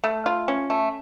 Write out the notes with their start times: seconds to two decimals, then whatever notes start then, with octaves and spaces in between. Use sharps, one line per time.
0.04 A3
0.26 F4
0.48 C#4
0.70 A3